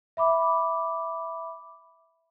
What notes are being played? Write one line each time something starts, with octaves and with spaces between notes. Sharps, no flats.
E5 B5 D6